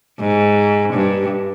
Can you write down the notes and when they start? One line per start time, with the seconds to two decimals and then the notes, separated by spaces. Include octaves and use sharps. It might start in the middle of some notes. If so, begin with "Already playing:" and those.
0.20 G#2
0.93 G2